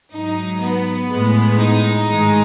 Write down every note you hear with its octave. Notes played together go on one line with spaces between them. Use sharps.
G#2 F#3 D#4
B3
A2 G#3
D#4
G#2 D#3 G#3